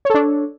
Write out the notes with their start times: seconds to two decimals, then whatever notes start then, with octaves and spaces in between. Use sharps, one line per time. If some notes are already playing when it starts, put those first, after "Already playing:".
0.05 C#5
0.10 A4
0.14 D4